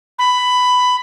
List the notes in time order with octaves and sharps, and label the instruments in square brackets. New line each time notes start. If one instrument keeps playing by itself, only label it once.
[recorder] B5